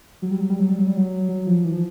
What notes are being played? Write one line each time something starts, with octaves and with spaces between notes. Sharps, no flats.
F#3
G3
F#3
G3
F#3
G3
F#3
G3
F#3
F#3
F3
E3
F3